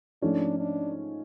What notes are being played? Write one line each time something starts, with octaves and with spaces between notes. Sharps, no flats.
G#2 F3 A3 C#4 D4
D4